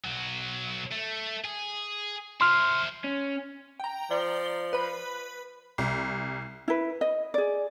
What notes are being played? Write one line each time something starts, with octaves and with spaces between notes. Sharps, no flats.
B1 F#3
A3
G#4
E4 C5 C6 F6
C#4
G5 A#5
F3 D5 G7
B4 B5
C2
E4 B4
D#5
G#4 D5